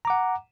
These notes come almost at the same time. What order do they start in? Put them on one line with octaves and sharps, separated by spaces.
A#5 D6 F#5